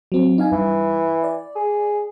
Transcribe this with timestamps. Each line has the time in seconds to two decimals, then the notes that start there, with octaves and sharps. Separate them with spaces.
0.12 F#3 C4
0.38 D#4 F5 G#5
0.52 G2 E3
1.24 D5
1.55 G#4